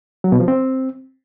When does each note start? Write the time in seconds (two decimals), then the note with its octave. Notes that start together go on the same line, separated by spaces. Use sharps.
0.24 F#3
0.32 B2
0.40 F3
0.48 C4